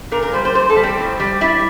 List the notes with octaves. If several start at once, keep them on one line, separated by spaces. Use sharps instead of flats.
A#2 A#4
A#4
G3 C5
C5
A#2 C5
A4
G3
C4
A2
G3
G3 E4